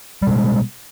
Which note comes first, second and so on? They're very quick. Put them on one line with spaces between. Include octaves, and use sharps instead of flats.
G3 B2 G#3